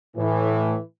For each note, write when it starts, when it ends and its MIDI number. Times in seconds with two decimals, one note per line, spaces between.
0.17 0.76 45
0.17 0.79 52